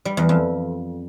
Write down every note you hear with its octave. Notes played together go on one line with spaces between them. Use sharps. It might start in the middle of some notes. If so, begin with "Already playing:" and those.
G3
E2
F2